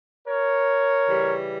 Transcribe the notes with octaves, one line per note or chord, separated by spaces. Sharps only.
A#4 C#5
C#3 E3 G3